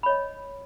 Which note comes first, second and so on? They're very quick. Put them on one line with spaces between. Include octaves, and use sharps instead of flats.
B5 C#5 D#5